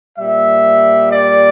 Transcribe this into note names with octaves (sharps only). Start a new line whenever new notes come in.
A#2 G3 E5
D5